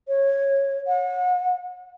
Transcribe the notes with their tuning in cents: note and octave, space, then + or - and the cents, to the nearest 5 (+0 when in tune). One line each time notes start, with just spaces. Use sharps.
C#5 -15
F#5 -40